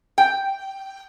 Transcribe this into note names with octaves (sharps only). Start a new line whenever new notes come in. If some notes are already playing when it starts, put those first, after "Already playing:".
G5